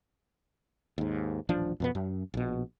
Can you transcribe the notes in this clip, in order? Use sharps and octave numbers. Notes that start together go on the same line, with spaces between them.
D#2 G#2
D#1 A1 F3 D4
F2 B2 B3
F#2
A#1 B2